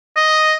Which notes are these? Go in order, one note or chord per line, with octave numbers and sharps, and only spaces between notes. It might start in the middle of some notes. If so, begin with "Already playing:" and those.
D#5